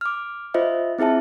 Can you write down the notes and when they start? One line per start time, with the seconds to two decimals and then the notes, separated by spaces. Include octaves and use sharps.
0.01 D6 F6
0.54 F4 C5 D#5 E5
0.99 C4 E4 G#4 E5 A5